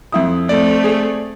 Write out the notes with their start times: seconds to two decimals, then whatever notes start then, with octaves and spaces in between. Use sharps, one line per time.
0.12 F2 E4 D#6
0.49 A3 C4 D5
0.84 G#4